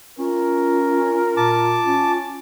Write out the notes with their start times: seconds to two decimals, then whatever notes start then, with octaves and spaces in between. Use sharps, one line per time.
0.19 C#4 F4 A#4
1.37 A#2 A5 D6
1.84 C#4